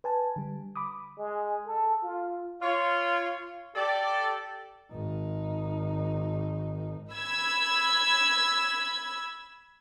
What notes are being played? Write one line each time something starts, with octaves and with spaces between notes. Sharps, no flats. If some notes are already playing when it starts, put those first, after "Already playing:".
B4 G#5 A5
D3 G3
B5 D6 D#6
G#3
A4
F4
F4 C#5
G4 A4 D5
G#1 D#4
B5 E6 G#6